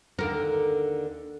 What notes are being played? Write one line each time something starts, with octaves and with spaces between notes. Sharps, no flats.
D#2 D3 A#4